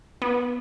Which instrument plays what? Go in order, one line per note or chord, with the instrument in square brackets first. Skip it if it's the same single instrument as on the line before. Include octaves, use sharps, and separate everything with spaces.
[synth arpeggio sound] B3